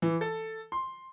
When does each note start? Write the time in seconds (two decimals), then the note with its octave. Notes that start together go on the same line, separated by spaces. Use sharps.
0.02 E3
0.21 A4
0.72 C6